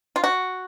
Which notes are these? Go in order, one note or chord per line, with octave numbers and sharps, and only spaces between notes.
F4
F#4